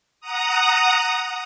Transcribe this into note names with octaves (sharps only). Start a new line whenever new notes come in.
F#5 A#5 D#6